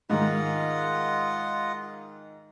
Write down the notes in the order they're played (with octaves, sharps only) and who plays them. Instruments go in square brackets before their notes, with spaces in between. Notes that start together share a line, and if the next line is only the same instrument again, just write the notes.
[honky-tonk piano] G#2 D#3 [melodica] F4 D#5 F#5